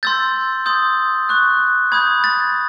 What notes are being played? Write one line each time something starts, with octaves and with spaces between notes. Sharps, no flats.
C6 E6 G6 A6
C6 D#6 G6
C#6 F#6
B5 D#6 G6 G#6
A6